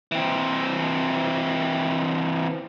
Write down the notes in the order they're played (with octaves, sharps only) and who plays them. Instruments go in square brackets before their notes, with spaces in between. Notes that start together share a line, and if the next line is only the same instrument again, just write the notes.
[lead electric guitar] E3 C4